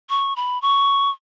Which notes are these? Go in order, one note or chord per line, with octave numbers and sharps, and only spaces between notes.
C#6
B5
C#6